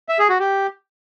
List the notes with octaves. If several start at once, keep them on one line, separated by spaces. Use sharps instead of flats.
E5
G#4
F#4
G4